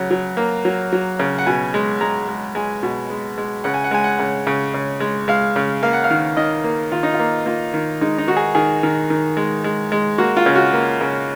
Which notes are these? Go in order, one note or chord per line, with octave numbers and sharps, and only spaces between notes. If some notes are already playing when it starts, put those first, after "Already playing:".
Already playing: C#3 F#3
F#3
A#3
F#3
F#3
C#3
F#5
B2 G#5
G#3
G#3 A#5
G#3
G#3 G#5
B2
G#3
G#3
C#3 F#5
G#5
F#5
G#3 G#5
F#5
C#3 F#5
C#3
C#3
G#3
G#3 F5
C#3
A#3 F5
F#5
F5
D#3
D#3 D#5
A#3
D#3 F4
D#4
F4
A#3
A#3 F4
D#3
G#3 D#4
D#4
D#3 F#4
G#4
D#3 G#4
D#3
D#3
G#3
G#3
G#3
A#3 F#4
F4
C#3
F#4
A#3
C#3